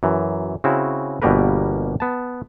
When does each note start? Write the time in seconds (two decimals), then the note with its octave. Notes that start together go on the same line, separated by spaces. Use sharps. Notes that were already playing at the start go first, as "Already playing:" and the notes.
0.03 F#2 E3
0.64 C#3 C4 E4 F#4
1.22 G1 B2 G3 A#3 A#4 B4
2.00 B3 A5